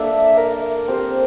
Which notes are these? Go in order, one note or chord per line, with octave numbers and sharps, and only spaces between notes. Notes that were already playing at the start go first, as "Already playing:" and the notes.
Already playing: A#3 D4 A4 D5 E5
A#4
C4 G4 C5